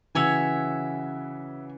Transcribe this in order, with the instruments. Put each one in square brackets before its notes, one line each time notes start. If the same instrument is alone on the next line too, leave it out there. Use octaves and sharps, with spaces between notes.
[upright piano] C#3 E3 [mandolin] F#4 C#5 E5 G#5